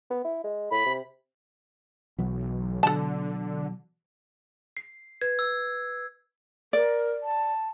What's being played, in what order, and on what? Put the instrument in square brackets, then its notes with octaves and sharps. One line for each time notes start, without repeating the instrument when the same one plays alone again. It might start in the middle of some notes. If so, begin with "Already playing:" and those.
[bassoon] B3
E4
G#3
[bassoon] A2 [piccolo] B5
[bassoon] C3
[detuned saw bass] B1 [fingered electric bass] B2 E3 F#3
[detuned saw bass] D3 [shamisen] A4 A5
[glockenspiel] C7
[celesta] B4 [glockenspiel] G#6
[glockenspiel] E6
[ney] A#4 [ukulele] D5
[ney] A5